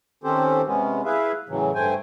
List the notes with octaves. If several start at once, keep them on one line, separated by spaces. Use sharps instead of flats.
D#3 C4 C#4 G4 A4 C5
C3 G#3 B3 C#4
E4 G#4 B4 E5 F5
A2 C#3 E3 F#3
G2 A3 C5 G5 G#5